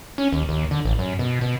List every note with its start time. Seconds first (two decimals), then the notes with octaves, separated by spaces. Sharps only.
0.18 C#4
0.33 D#2
0.49 D#2
0.71 D3
0.85 A1
0.99 F#2
1.19 B2
1.41 B2